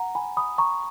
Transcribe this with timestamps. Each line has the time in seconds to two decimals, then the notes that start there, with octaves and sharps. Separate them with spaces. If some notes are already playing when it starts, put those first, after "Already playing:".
Already playing: F#5 A#5
0.15 G#5 B5
0.37 B5 D#6
0.58 A#5 C#6